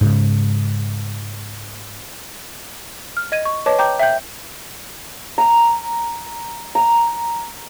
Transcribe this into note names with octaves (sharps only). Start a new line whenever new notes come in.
G#2 C#3
F6
D#5 G#6 D#7
C#6
B4 C#5 D#5 A5 D6
G5 A#5 D6 G6
E5 G5 G6
A#5
A#5